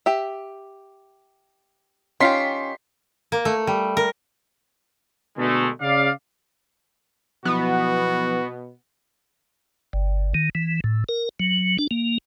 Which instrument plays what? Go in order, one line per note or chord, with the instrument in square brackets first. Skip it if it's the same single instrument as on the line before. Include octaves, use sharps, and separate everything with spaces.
[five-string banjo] G4 E5
[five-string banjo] D#3 F4 G4 [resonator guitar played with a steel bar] C#4 [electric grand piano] C6 B6 C7
[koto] A#3
A3
G3
A#4
[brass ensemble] B2 D3 G#3 A3
C#3 D5 F5
[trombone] B2 [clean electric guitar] F3 F#3 E4 [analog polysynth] B3 [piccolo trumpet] F#4
[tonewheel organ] G1
D#3
E3
A2
A#4
F#3
D4
A#3